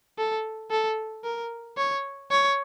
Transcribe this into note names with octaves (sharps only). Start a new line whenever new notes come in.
A4
A4
A#4
C#5
C#5